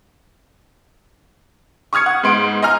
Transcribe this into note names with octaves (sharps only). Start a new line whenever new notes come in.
C#6 D#6 F6 G#6 C#7
F#5
G#2 B3 C6 D7
D#5 G#5 A#5 F6